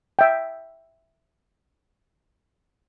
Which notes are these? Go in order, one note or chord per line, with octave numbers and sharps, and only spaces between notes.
E5 G5